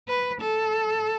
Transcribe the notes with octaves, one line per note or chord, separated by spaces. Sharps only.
B4
A4